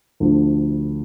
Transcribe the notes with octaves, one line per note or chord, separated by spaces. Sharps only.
D2 D3 F3